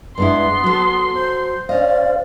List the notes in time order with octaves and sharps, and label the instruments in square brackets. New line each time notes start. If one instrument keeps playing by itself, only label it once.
[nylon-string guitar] G2 G#3 E4 [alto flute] B3 [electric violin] C6
[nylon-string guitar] F#3 A4
[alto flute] C5
[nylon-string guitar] C#4 D#5 [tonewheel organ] C5 F5 [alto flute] D5